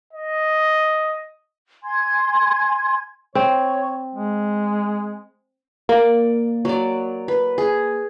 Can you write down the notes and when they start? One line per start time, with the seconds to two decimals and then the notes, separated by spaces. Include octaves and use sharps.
0.13 D#5
1.84 G#5 C6 G#6
3.35 C4 C#5
4.15 G#3
5.89 A#3 D5
6.65 F#3 D5
7.28 B4
7.58 G#4